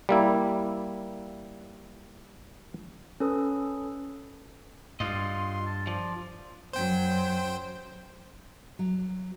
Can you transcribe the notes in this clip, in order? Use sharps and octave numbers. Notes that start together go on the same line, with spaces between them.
G3 A#3 E4
C#4 A4 B4 D#6
G2 F4 D#5 C6
A5
F3 D5
F#2 F#3 C5 G5
F#3